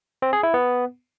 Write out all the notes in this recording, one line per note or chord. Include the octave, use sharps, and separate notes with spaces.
C4
G#4
E4
B3